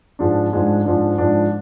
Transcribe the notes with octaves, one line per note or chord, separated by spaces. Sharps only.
G#2 F3 G#3 D4
G#2 F3 G#3 D4
G#2 F3 G#3 D4
G#2 F3 G#3 D4